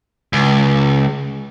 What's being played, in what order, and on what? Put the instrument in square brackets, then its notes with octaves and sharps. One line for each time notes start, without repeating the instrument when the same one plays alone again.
[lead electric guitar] C#2